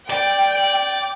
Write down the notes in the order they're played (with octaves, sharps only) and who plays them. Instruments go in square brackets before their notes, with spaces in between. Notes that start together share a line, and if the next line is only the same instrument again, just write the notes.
[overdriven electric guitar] D5 [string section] G5